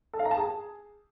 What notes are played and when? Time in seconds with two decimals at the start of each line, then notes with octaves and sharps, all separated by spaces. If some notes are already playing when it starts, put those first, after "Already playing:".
0.13 A4
0.19 F5
0.25 A#5
0.31 A5
0.37 G#4